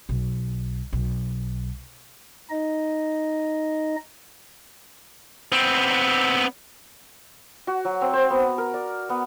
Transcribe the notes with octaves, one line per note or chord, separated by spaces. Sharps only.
B1
B1
D#4 D#5
B3 C4
F#4
F#3
C4
C5
B3
A#4
D5
B3